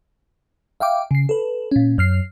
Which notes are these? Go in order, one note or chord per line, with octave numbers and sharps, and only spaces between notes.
E5 F5 G5 D6
C#3 C7
A4 B4
A#2 C#4
F#2 F6 C7